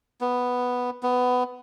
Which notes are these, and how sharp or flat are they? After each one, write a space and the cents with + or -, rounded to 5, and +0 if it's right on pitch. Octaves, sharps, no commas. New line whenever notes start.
B3 +0
B3 +15